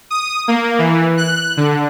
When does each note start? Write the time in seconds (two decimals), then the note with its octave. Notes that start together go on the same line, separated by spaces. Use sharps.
0.10 D#6
0.48 A#3
0.79 E3
1.17 F#6
1.57 D3